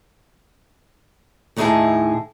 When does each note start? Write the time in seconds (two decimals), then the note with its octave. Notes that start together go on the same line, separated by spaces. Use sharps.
1.56 D#2 A2 D#4 E4 G#4 A5